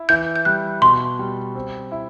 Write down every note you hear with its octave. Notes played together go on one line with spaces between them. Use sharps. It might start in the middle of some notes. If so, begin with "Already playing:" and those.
Already playing: E4
E3 G6
G6
G3 F#6
B2 C6
G3
C4
E4